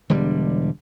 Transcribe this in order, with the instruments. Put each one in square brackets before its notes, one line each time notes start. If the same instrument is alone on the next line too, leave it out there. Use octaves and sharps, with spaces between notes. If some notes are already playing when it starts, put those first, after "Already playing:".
[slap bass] E1 D3 G3